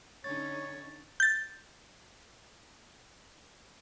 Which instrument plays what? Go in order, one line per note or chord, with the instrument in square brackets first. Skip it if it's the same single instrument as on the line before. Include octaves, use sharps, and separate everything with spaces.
[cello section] D3 C#4 D#4 [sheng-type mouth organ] C#5 [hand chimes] A6
[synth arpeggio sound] G6 A6